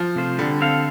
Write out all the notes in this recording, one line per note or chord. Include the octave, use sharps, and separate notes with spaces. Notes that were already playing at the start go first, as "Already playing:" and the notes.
Already playing: F3
C3 A3 F4 C5
D3 G3
C4 A4 F5